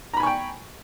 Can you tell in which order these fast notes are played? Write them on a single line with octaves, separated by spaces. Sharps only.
A#5 B5 G#5 C#6 G5